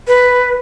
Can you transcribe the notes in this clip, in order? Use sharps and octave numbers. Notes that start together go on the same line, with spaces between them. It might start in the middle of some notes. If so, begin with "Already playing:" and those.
B4